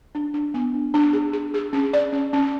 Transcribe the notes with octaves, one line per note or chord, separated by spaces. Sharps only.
D4
D4
B3
D4
D4
G#4
G#4
G#4
C#4
D5
C#4
C#4